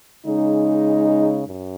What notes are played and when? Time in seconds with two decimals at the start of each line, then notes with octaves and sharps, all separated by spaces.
0.24 C#3 G#3 D#4
1.46 F#2